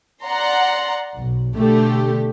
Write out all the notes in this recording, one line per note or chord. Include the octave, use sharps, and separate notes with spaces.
D5 F#5 A#5 C6
B1
B2 D3 A3 G4